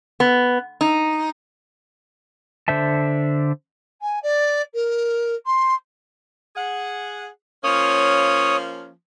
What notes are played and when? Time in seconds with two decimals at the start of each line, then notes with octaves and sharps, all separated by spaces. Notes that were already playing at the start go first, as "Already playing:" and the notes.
0.20 B3
0.81 D#4
2.68 D3 C5 E5 A5
4.01 G#5
4.22 D5
4.74 A#4
5.46 C6
6.56 G#4 F#5
7.64 F3 A#3 C#4 C#5 D#6